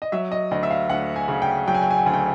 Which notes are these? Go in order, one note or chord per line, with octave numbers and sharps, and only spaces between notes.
D#5
F#3 E5
D#5
D2 D#5
E5
F5
D2 F#5
G#5
C#3
G5
F#3 G5
G#5
G5
G#5
G5
D2 G#5
G5